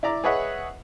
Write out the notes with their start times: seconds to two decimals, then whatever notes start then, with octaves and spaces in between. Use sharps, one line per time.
0.03 E4 D5 A#5 D6
0.24 G#4 B4 C#5 D#5 E5 F#5